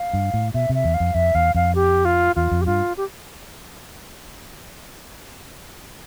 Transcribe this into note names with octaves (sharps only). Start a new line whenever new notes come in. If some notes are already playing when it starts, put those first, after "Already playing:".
Already playing: F5
G2
A2
B2 E5
C3
E5
E2
F5
F2
F2 E5
E2 F5
F2 F5
G4
F4
E2 F4
F2
G4
G2 F4
G4